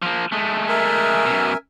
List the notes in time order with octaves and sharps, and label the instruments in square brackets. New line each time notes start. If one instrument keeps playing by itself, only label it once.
[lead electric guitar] F3 A#3
G#3 A3
[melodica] A#4 E5 G#5
[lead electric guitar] F#2 B2